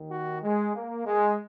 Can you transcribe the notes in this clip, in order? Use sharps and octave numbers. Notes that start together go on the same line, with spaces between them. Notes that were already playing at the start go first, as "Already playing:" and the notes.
Already playing: D#2 D#3
F#4
G#3
A#3
G#3